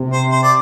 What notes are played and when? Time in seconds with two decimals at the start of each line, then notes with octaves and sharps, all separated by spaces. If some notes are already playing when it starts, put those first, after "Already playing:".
Already playing: C3
0.13 C5
0.31 C5
0.43 D5